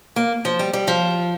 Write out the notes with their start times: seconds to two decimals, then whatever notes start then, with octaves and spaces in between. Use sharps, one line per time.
0.16 A#3
0.45 F3
0.59 G3
0.73 G3
0.88 F3